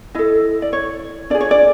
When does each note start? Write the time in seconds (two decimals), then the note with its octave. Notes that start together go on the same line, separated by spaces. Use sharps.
0.15 E4 A4 D#5
0.62 D5
0.73 C#5
1.30 D4 F4 G#4 D5
1.41 C#5
1.51 D5